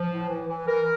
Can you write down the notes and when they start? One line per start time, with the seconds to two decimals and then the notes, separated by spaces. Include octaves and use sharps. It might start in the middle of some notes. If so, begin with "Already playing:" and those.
Already playing: F3
0.08 A2
0.28 E3
0.48 E3
0.66 E3 A#4